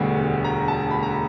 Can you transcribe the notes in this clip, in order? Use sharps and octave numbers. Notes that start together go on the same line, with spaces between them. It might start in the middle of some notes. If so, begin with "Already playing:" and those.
Already playing: E1 D2 D3 G3 B3
A#5
A5
B5
A#5